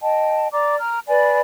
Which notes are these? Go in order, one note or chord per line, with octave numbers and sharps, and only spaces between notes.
D#5 G5 A5
D5 A#5 D6
A#5 F6
B4 D5 G#5 B5